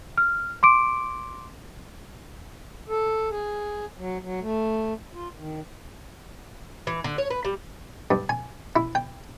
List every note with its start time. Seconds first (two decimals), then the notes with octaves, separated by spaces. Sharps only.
0.18 F6
0.63 C6 D6 D7
2.89 A4
3.30 G#4
3.99 F#3
4.23 F#3
4.41 A3
5.15 F4
5.37 D#3
6.87 E3
7.04 D3
7.18 C#5
7.30 B4
7.45 G3
8.11 G2
8.29 G#5
8.76 E4
8.95 G5